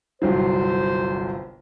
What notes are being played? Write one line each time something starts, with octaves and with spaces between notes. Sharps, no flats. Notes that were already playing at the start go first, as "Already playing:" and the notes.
G1 C2 F#3 C5